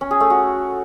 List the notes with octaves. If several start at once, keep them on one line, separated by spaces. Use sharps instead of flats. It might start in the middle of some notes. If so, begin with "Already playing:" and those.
C#4
G#4
A3
F#4